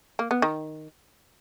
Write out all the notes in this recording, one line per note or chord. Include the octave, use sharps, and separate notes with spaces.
A#3
B3
D#3